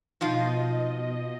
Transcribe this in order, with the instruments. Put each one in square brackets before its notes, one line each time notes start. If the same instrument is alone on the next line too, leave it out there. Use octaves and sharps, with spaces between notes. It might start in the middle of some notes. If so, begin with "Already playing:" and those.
[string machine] B2 D#5 [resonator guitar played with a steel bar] F3 D#4 F4